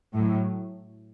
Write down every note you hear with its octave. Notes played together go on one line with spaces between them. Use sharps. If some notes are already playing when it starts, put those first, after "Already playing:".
A2 F#3